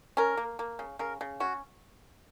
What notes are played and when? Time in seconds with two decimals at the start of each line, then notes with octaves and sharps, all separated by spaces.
0.17 C#4 A#4
0.37 A#3
0.59 A#3
0.79 C#3
0.99 C#3 A#4
1.21 C#3
1.40 C#4 F#4